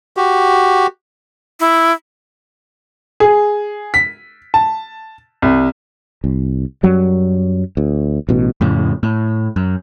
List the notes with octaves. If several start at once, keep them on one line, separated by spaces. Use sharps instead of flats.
F#4 G4
E4
G#4
B6
A5
C2
C2
F#2 F#3 G3
D2
A1 B2
F2 A2 C#3
A2
F#2